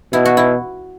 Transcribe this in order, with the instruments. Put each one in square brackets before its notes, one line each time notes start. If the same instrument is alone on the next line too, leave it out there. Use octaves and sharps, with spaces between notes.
[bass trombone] B2 [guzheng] E4
[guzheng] F#4
E4